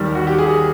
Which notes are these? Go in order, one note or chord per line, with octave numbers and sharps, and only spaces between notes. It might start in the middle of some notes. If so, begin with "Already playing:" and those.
Already playing: D#2 D#3 G3
F#4
G4
G#4